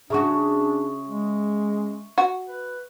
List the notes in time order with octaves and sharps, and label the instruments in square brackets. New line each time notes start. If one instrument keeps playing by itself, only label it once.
[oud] C#3 F#4 [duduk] D4 [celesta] E5 C#6
[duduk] G#3
[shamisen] F#4
[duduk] B4